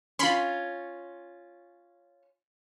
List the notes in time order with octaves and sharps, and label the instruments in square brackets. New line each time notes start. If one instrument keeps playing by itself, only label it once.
[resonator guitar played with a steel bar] C#4 F4 [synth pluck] B5 C6